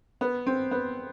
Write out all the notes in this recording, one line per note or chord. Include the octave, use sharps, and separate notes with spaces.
B3
C4
B3